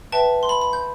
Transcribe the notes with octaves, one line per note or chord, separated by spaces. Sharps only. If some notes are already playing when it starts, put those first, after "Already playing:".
B4 E5 G5 A5
C6
B5
B5
G6